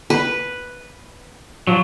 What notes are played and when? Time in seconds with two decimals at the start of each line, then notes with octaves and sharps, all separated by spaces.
0.10 B4
1.67 F3 F#3